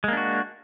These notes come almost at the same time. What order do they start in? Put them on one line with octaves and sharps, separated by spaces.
G#3 A#3 D4 F#4